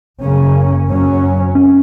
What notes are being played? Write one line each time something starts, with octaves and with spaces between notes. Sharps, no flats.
F#1 F#2 C#3 A#3 C#4
F#2 F#3 C#4
C#4